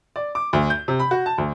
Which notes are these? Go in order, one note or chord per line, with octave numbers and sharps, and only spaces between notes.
D5
D6
D2
G6
C3
B5
F#4
A5
D2